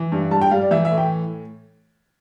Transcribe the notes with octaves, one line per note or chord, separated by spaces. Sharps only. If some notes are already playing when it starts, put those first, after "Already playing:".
Already playing: E3
G2
G3 A5
G5
G3 F5
D5
E3 E5
E5
A2
G5